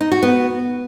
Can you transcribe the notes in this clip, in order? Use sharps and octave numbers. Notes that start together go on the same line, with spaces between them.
D#4
F#4
B3